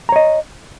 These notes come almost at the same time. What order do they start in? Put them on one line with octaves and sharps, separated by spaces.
A#5 C#5 D#5